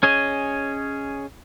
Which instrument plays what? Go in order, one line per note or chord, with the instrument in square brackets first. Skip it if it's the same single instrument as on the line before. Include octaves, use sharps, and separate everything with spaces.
[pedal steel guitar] C#4 G#4 C#5 D#5